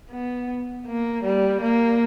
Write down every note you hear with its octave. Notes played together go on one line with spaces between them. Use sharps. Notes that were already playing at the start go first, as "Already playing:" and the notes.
B3
A#3
G3
A#3